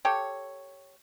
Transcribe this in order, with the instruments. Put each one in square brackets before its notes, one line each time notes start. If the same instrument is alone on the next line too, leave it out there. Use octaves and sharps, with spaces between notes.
[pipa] G4 A4 C#5